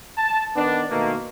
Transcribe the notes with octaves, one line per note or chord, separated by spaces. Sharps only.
A5
D#3 B3 D4
B2 D#3 A3 A#3